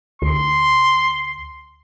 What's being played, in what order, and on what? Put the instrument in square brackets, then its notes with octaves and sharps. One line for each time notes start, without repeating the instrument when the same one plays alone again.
[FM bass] D2 [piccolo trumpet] C6